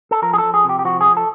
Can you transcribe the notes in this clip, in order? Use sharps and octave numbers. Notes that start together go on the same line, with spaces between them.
A4
F3 A#4
G#4
F3 A4
G#4
C3 G4
G4
F3 F#4
G#4
F3
A4